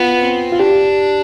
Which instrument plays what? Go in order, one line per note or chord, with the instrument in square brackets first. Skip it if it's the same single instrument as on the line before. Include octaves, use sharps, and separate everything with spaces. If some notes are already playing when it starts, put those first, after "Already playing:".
Already playing: [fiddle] B3 [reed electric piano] F4
[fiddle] C4
[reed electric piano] F4
[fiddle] D4 [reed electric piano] G4